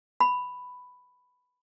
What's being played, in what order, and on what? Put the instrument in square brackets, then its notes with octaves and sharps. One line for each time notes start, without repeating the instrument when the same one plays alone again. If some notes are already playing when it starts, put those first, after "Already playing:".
[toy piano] B5